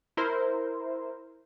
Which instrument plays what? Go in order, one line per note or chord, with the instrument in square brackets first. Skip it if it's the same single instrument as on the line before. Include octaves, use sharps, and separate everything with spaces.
[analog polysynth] E4 A#4 C5